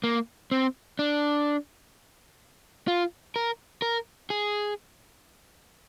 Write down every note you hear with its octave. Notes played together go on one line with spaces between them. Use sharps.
A#3
C4
D4
F4
A#4
A#4
G#4